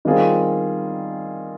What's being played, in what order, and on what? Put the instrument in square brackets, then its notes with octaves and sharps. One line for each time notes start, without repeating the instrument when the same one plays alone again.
[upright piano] D#3 G3 C4 F4 G#4